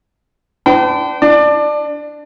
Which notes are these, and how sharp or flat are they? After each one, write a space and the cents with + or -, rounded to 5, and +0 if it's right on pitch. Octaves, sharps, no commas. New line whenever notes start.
D4 +0 C5 -45 G5 -40
D4 +0 D5 +20